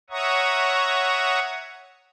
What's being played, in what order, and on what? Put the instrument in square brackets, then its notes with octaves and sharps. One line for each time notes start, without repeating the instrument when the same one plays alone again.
[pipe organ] C#5 E5 F#5 A#5 C#6 D#6